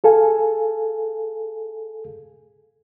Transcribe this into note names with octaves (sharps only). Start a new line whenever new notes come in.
G#4 A4 F5 G#5